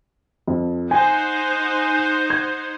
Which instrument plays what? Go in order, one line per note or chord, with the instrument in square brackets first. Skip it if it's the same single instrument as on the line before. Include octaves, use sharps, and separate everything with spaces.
[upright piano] F2
[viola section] D#4 C5 F#5 [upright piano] G#5
[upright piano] G#6